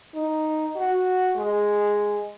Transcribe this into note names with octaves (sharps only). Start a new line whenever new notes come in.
D#4
F#4
G#3